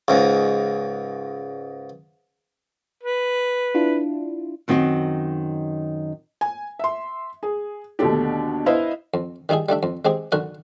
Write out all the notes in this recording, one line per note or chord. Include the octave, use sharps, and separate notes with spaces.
C#2 G#2
B4
D4 E4 F4
F#2 D#3 C4 F#4 D#5
G#5
E5 C6
G#4
D#2 B2 D3 A3 D4 G4
E4 B4 C5 D#5 F5
F2
D#3 G3 D#4 E4 G#4
G3 A3 D4 E5
F2
G#3 C4 G4 G#4
B1 D3 F#4 A#4 F#5